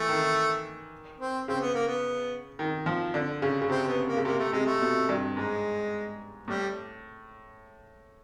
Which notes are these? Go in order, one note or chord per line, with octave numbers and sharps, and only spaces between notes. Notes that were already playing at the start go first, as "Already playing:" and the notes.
Already playing: E3 A3
D#3
C4
C#3 C4
B3
A#3
B3
D#3
F3
D3
C#3
C#3
C3 C4
B3
A#3
C#3
C3 A#3
A3
C3 G#3
A3
B2
G2
G#2 G#3
A2 G3